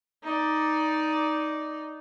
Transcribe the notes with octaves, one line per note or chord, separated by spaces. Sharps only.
D#4 D5